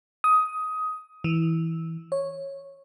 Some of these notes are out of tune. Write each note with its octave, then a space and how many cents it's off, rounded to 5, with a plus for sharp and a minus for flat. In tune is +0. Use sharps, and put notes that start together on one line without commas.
D#6 +15
E3 -15
C#5 -10